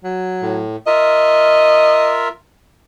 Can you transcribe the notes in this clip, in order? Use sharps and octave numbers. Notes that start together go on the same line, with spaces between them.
F#3
A2
F4 A#4 D#5 E5